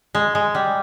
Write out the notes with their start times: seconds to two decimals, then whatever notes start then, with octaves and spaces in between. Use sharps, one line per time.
0.15 G#3
0.35 G#3
0.55 G3